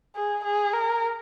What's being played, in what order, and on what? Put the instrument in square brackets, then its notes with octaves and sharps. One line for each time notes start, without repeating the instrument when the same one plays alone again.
[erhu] G#4
G#4
A#4